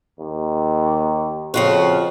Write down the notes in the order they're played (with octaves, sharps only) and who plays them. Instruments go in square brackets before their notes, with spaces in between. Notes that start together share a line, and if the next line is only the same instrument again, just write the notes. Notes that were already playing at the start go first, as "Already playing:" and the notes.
[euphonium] D#2
[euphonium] F2 [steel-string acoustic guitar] C#3 F4 F#4